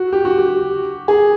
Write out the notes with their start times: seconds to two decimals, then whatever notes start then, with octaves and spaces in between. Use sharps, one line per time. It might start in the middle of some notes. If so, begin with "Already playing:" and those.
Already playing: F#4
0.13 G4
0.25 F#4
0.38 G4
1.08 G#4